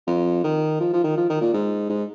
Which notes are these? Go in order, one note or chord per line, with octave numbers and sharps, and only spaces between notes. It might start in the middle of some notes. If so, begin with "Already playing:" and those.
F2
D#3
F3
F3
D#3
F3
D#3
A#2
G#2
G#2